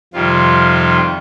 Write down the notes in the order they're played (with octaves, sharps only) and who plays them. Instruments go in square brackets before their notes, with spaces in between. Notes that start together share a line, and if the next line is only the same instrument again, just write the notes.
[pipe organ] F2 C3 D#3 G3 F4